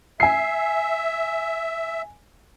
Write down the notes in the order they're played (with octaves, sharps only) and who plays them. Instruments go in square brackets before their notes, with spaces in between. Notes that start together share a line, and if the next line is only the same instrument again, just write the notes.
[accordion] E5 [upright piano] G#5 C7